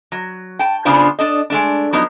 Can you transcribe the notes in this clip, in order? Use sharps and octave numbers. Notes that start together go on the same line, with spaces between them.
F#3
G5 A5
C#3 B3 D4 F4 C5
D4 A4 D#5
G#3 A3 D4
F3 F#3 B3 D#4